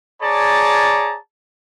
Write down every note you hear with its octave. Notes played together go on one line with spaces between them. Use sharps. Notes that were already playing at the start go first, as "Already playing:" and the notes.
G#4 C#5 D5 A5 A#5